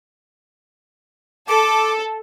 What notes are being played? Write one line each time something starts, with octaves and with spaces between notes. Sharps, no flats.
A4 D6